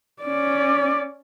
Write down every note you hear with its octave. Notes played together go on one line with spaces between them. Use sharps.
C#4 D5